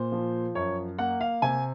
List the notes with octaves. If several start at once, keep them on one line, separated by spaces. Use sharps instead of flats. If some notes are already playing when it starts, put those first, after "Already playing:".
Already playing: A#2 C5
F3
F#2 C#5
A#3 F#5
F5
C3 G#5